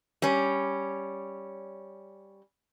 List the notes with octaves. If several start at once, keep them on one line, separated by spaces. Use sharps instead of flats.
G3 C#4